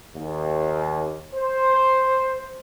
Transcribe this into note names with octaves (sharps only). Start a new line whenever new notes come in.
D#2
C5